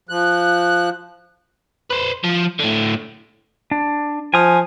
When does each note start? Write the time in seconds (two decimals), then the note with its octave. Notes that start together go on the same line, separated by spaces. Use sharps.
0.09 F3 F#6
1.91 B4 C5
2.24 F3
2.59 A2 D3
3.71 D4
4.34 F3 G#5 D#6